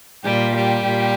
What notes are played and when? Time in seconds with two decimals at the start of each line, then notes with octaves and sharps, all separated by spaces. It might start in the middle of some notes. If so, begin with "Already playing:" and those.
0.24 A#2 G3 G4
0.55 G3 G4
0.85 A#2